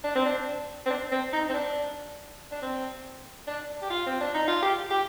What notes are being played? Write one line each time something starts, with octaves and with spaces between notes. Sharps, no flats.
D4
C4
D4
C4
D4
C4
D#4
C4
D4
D4
C4
D4
G4
F4
C4
D4
D#4
F4
G4
G4